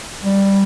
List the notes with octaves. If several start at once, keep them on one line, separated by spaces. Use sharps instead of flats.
G3